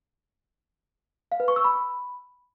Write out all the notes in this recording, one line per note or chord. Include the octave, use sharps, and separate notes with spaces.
F5
B4
C#6
E6
B5